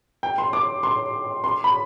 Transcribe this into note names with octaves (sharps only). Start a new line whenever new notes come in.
G5
C6
D6
C6
C6
B5